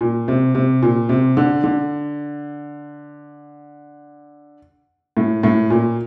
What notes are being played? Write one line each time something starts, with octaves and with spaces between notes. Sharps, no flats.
A#2
C3
C3
A#2
C3
D3
D3
A2
A2
A#2